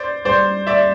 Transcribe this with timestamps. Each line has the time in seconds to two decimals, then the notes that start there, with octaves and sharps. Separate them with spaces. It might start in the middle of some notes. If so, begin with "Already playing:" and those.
Already playing: C5 D5
0.25 G3 C5 D5
0.67 D5 E5